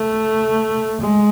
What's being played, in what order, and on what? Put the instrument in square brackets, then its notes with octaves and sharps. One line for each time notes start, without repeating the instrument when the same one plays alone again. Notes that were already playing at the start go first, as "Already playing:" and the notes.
Already playing: [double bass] A3
G#3